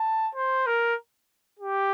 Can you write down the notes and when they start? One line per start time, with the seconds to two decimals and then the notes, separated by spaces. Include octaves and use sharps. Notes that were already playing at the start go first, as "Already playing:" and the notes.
Already playing: A5
0.35 C5
0.66 A#4
1.59 G4